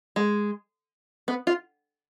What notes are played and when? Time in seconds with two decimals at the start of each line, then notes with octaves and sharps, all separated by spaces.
0.16 G#3
1.28 B3
1.47 F4